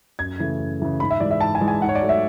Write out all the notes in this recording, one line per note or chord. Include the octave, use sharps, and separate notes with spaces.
F#2 G#6
C#3 E3 A3
F#2
C#3 E3 A3
G#2 B5
E5
E3 G#3 D5
E5
G#2 A5
G#5
E3 G#3
G#5
G#2 F#5
C#5
D5
F#3 A3
E5